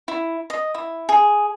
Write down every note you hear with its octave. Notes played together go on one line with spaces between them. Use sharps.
E4
D#5
E4
G#4